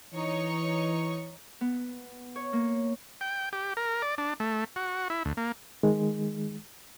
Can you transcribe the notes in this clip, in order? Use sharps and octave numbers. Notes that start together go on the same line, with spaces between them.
E3 D#4 C#5 C#6
B3
C#5
A#3
G5
G4
A#4
D5
D4
A3
F#4
E4
D2
A#3
D#3 G#3